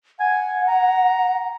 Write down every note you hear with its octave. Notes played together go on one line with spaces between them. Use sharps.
F#5 G#5
A#5